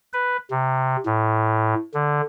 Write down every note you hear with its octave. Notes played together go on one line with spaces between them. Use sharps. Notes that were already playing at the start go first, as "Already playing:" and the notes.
B4
C3
A2
D3